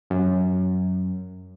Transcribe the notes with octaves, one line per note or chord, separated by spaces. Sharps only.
F#2